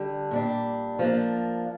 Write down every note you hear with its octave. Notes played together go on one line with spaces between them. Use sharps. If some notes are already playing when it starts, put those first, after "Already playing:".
Already playing: D3 G3 D4
A#2 G3 D4
F3 A#3 D4